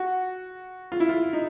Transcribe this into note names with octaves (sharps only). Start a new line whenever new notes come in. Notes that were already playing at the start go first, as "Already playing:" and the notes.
Already playing: F#4
F4
E4
F4
D#4